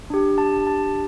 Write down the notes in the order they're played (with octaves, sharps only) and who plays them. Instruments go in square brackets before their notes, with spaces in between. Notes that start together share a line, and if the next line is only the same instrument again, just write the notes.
[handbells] D4 G4
A5
A5